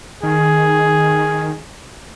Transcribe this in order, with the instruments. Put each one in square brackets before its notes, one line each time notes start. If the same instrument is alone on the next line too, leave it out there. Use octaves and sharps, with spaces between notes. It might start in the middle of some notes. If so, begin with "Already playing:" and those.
[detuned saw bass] D#3 [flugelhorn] G#4